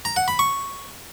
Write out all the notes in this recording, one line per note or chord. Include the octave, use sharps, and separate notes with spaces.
A#5
F#5
B5
C#6